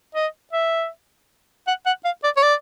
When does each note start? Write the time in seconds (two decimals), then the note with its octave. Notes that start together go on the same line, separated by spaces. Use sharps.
0.15 D#5
0.53 E5
1.67 F#5
1.86 F#5
2.05 F5
2.24 D5
2.37 C#5
2.43 D5